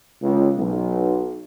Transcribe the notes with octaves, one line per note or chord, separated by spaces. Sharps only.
C#2
B1